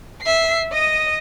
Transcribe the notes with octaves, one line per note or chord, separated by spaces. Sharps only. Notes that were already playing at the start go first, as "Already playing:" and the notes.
E5 C7
D#5 D#6